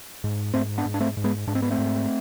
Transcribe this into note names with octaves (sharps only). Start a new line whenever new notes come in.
G#2
G#2 A3 C4
B3 D4
G#2
D4
A3 C4
G#2
G#3 B3
G#2 D4
C4
B3
A3 C4
G#2